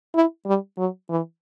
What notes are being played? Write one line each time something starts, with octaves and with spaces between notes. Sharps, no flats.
E4
G3
F#3
E3